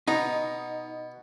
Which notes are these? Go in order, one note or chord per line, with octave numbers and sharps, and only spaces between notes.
B2 D#4